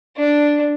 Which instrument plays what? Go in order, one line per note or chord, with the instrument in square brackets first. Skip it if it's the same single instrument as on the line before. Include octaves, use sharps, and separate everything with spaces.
[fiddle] D4